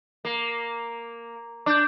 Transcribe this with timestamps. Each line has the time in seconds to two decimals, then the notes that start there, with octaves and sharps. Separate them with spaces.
0.25 A#3
1.66 D4 D6 G6